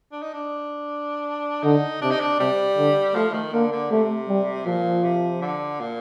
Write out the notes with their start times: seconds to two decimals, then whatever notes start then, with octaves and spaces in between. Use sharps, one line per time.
0.12 D4
0.22 D#4
0.34 D4
1.63 D3 D#4
2.02 C3 D4
2.11 D#4
2.20 D4
2.39 C3 G3
2.77 D3
3.15 F3 A3
3.33 D#3
3.53 D3 A#3
3.72 D3
3.90 C3 A3
4.28 G3
4.66 A#2 F3
5.04 C3
5.41 D3
5.80 A#2